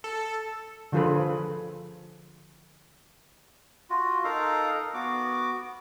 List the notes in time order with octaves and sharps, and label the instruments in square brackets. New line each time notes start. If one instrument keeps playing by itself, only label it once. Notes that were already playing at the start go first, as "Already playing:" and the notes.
[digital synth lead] A4
[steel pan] D3 F3 F4 G#4 A4 B4
[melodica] F4 F#4
D#4 A4 A#4 F5
B3 F#4 D6